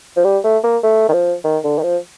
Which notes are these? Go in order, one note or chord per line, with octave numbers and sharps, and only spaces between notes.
F3
G3
A3
A#3
A3
D#3
F3
D#3
D3
D#3
F3